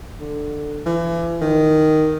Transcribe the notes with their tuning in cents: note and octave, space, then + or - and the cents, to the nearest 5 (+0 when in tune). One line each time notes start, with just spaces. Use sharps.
D3 +10
E3 +35
D#3 +0